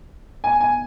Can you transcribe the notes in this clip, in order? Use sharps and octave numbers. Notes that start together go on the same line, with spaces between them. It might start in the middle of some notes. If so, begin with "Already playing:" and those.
G#5
G#5